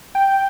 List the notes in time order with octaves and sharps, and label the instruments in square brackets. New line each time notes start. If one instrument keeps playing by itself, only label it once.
[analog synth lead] G5